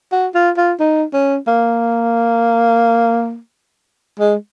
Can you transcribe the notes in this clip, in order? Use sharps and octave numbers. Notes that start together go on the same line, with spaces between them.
F#4
F4
F4
D#4
C#4
A#3
G#3